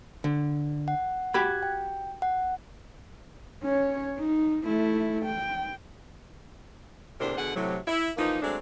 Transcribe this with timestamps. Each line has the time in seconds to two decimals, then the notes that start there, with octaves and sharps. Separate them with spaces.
0.24 D3
0.88 F#5
1.34 F#4 G4 B5 F#6 G#6
1.63 G5
2.22 F#5
3.63 C#4 C#5
4.19 D#4
4.64 A3 E4
5.25 G5
7.20 E2 A2 C3 D4 A#4 C5
7.37 B2 D3 G#4 F#5
7.56 A2 C3 F#3
7.88 E4
8.17 E3 F3 A#3 D#4
8.42 F#3 G#3 A3 C4 D4